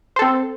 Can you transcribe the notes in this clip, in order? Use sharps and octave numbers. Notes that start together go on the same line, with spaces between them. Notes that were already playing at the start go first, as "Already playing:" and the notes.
C4 A4 C5